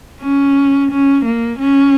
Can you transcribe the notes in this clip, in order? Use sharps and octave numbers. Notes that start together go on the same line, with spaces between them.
C#4
C#4
A#3
C#4